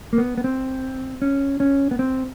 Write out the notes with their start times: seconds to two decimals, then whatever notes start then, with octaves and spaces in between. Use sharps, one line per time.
0.13 A#3
0.18 B3
0.38 B3
0.44 C4
1.22 C#4
1.60 C#4
1.91 B3
1.99 C4